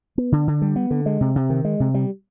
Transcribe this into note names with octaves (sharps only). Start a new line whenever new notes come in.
B3
D3
D3
G3
B3
D3
G#3
C3
C3
D#3
G#3
C3
G3